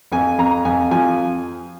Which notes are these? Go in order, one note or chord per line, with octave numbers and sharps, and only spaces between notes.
F2 G#5
F2 A#5
F2 G#5
F3 G#5